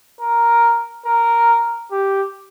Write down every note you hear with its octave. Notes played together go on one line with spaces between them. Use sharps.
A#4
A#4
G4